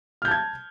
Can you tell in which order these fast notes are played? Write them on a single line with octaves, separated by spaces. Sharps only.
F6 G6 A5 G#6